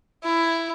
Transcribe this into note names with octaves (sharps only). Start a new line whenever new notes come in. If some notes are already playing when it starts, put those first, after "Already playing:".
E4